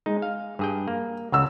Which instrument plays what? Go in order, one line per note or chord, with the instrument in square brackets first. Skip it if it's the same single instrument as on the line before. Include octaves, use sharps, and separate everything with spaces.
[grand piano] G#3 [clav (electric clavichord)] D#4
[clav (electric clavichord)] F5
G2 G#4 G5
A#3
[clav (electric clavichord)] C#2 C#3 [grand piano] F#5 E6